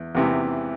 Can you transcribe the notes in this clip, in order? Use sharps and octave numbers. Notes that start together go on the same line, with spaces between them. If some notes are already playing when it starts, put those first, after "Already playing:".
Already playing: E2
E2 C3 E3